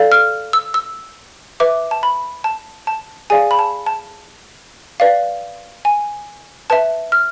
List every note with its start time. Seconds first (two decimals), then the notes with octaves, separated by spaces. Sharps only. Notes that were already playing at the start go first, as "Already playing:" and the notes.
Already playing: A4 D5 F5
0.12 F6
0.53 E6
0.74 E6
1.60 B4 E5 D6
1.91 A5
2.03 B5
2.44 A5
2.87 A5
3.30 G#4 D5 F5 G#5
3.51 B5
3.59 A5
3.86 A5
5.00 B4 D5 F5
5.85 G#5
6.70 B4 E5 A5
7.12 F6